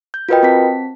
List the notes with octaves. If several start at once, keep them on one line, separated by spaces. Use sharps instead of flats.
G6
F4 F#4 A#4 B4 D#5 G5
C4 A5 B6